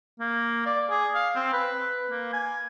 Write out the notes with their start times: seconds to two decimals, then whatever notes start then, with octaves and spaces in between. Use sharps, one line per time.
0.20 A#3
0.66 D5
0.90 G#4
1.15 F5
1.35 C4
1.53 B4
2.10 A#3
2.33 G#5